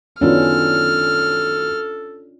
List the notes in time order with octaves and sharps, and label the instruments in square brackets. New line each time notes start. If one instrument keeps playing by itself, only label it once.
[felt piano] F#2 D#3 B3 [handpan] C#4 D4 F4 [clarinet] A4 [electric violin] F6